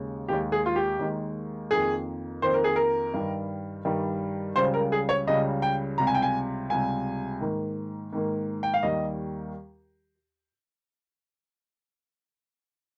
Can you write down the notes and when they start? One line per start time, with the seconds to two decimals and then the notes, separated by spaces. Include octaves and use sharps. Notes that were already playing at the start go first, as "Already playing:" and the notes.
Already playing: D#2 C#3 G#3
0.28 D#2 D#3 G#3 G4
0.52 G#4
0.66 F4
0.76 G4
0.99 D#2 D#3 G#3
1.71 F2 D#3 A#3 G#4
2.42 F2 D#3 A#3 C5
2.54 A#4
2.64 G#4
2.76 A#4
3.14 G2 D#3 G3
3.85 G2 D#3 G3
4.55 C#2 C#3 G3 C5
4.74 A#4
4.92 G#4
5.09 C#5
5.27 C#2 C#3 G3 D#5
5.62 G5
5.98 C#2 C3 G3 A#5
6.07 G#5
6.14 G5
6.22 G#5
6.70 C#2 C3 G3 G#5
7.41 G#2 D#3 A#3
8.13 G#2 D#3 A#3
8.63 G5
8.74 F5
8.83 D#2 D#3 G3 D#5